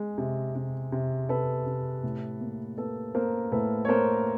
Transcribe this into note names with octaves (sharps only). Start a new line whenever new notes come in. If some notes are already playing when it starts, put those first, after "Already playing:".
Already playing: G#3
C3
C3
C3
C3 A4 B4
C3
A2
A#3
A#3 A4 B4
A#3 A#4 C5
A2 A4 B4
C#5
A#3 A#4 C5